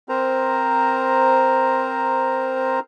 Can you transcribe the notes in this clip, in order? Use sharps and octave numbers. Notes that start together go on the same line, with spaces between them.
C4 A#4 C5 A#5